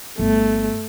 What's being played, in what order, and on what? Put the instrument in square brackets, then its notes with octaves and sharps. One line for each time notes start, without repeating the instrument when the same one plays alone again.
[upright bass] G1 [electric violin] A3